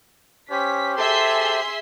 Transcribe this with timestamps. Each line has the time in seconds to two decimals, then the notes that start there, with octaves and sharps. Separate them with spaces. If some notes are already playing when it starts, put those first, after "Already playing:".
0.50 C#4 G4 C5 B6
0.98 G#4 A4 E5 C6